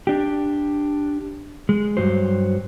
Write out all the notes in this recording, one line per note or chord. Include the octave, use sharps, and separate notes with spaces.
D4 G4
G#3
G2 F#3 C5